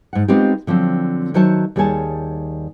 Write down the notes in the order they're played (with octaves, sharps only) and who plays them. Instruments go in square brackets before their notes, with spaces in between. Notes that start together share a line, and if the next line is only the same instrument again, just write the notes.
[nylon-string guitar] G#2 F#5
G#3 B3 C4 D#4 F4 G4
D3 F3 F#3 C4
D#3 F#3 C5 C#5 E5 A5
D#2 G3 G#4 C#5 G#5 A5